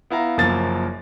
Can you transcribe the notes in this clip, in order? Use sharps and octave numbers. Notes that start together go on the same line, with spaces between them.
B3 E4 F5 A#5
F#1 F#2 F3 A#3 A6